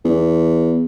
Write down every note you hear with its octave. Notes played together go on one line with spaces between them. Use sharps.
E2